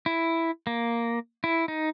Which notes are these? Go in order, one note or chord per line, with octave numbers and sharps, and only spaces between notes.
E4
A#3
E4
D#4